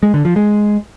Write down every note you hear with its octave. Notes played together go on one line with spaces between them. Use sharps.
G#3
D3
F3
G#3